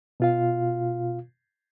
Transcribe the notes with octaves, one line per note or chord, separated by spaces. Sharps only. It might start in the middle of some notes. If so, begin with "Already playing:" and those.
B2 F4 F5